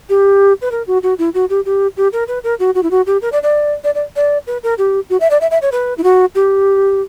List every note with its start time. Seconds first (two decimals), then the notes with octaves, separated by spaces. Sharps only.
0.09 G4
0.62 B4
0.71 A#4
0.87 F#4
1.03 F#4
1.18 E4
1.34 F#4
1.50 G4
1.65 G4
1.97 G4
2.13 A#4
2.28 B4
2.44 A#4
2.60 F#4
2.75 F#4
2.83 E4
2.91 F#4
3.06 G4
3.22 A#4
3.32 D5
3.43 D5
3.84 D5
3.95 D5
4.16 D5
4.47 B4
4.63 A#4
4.78 G4
5.10 F#4
5.20 E5
5.30 D5
5.41 E5
5.51 E5
5.62 C#5
5.72 B4
5.98 E4
6.03 F#4
6.35 G4